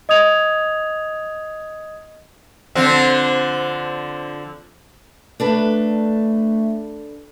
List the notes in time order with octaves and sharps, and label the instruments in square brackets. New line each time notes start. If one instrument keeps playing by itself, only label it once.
[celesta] D#5 D#6 G#6 F7
[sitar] D3 F3 C4
[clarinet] A3 [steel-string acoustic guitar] D4 A4 B4